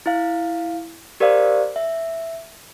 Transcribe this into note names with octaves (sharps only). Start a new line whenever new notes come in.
E4 F5
G4 A#4 C5 D5 F5
E5